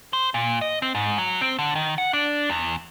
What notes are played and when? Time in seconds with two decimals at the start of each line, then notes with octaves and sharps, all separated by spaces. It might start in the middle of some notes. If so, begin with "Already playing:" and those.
0.13 C5
0.34 A#2
0.61 D#5
0.82 C4
0.95 G#2
1.18 F#3
1.41 C4
1.59 D3
1.75 D#3
1.98 F#5
2.13 D4
2.50 E2